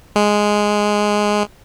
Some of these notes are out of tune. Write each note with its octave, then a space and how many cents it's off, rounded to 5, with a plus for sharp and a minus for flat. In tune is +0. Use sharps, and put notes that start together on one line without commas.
G#3 +0